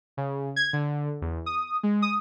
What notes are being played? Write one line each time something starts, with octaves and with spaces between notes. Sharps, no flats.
C#3
G#6
D3
E2
D#6
G#3
D#6